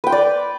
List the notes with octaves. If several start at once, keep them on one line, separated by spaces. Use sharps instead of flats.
B4 D5 G5 C6